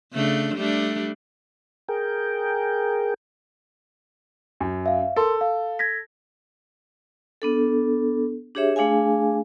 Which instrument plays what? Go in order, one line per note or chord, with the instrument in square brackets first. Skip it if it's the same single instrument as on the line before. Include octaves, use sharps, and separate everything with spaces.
[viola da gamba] C#3 A3 D4
G3 A3 D4
[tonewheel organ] G#4 A#4 G5
[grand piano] F#2
[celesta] E5 F5
[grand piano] A4 [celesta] A#4 C6
[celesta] F5
G#6 A#6 B6
[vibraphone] B3 D4 A4
D4 G4 G#4 C#5 E5
A3 D4 G#4 F5 G#5